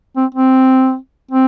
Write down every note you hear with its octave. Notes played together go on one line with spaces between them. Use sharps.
C4
C4
C4